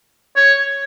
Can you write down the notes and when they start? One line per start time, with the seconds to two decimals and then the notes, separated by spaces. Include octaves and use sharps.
0.36 C#5